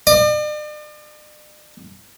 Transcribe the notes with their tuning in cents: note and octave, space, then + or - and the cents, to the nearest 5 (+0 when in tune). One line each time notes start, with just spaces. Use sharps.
D5 +45